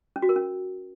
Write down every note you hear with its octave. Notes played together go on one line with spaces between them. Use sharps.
C#4
F#4
A#4
C#4